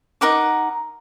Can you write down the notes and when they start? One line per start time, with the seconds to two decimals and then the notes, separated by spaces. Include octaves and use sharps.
0.21 D#4 A#4 F#5 D6